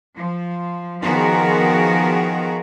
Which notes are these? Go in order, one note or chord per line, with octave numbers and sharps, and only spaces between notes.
F3
D#3 F3 B3 F#4 G#4 A#4